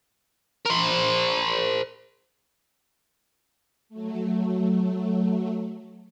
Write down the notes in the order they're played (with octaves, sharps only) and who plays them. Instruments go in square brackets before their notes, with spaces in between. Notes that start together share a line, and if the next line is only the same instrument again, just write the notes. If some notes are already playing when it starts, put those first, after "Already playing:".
[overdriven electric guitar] A#4 C5
[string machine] F#3 A3